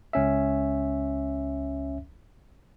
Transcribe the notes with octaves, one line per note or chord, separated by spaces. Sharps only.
C#2 C#4 E5